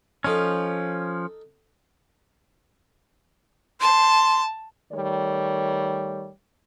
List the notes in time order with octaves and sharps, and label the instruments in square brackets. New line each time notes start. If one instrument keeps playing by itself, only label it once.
[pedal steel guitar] F3 C#4 [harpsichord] D#4 A4 F5
[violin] A5 [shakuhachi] C6
[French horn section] D#3 G3 A3 C#5